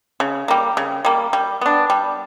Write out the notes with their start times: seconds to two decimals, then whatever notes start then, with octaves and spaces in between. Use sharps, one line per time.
0.20 C#3
0.48 G3 A#3
0.77 C#3
1.05 G3 A#3
1.33 G3
1.61 B3 D4
1.90 G3